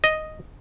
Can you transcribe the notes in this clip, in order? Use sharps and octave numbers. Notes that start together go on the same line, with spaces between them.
D#5